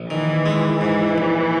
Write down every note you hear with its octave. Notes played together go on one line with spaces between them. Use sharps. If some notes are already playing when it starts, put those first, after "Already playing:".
Already playing: A#1
D#3 E3
G#3
G#2 E3
A#1